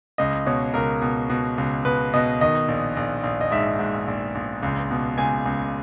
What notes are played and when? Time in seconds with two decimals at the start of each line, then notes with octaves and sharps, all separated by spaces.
0.18 C#2 D#5
0.46 B2 C#5
0.74 C#2 A#4
1.01 B2
1.30 B2
1.58 C#2
1.85 B2 B4
2.14 B2 D#5
2.41 D#3 D#5
2.68 A#1
2.97 A#1
3.24 A#1
3.41 D#5
3.51 G#2 E5
3.79 G#2
4.08 A#1
4.35 A#1
4.63 C#2
4.91 B2
5.18 C#2 G#5
5.46 C#2